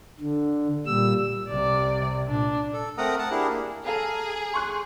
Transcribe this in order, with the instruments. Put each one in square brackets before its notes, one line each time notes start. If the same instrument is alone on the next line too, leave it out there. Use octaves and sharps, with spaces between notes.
[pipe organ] D3
A#2 G3 E6
[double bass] C2 C3 [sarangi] D5
[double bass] A#2 [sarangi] D4
[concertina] A4
A3 C4 A#4 F#5 A#5 D#6
F#5 A5
D4 E4 G4 G#4 A#4
A#3
[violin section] G#4 [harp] A4 F5 A#5
[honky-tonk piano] C6 C#6 F#6